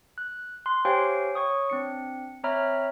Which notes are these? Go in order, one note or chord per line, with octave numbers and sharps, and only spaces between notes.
F#6
C6 F#6
G4 C5 C#5 F5 G5 G#5
C#5 C#6 D#6
C4 D4 C#7
C4 C#5 E5 A#5 B5 F6